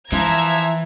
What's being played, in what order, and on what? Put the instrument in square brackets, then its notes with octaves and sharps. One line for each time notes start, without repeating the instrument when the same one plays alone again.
[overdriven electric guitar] E3 [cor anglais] F3 [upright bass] E4 [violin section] E5 A#5 G#6